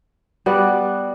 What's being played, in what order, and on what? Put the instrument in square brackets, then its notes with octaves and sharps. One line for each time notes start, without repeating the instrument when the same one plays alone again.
[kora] G3 B3 F#4 D5